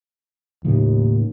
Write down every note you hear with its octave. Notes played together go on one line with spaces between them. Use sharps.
D#2 A2 C#3 F3